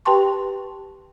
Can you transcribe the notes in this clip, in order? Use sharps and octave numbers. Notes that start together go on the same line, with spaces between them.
G4 B4 G5 A5 C6 C#6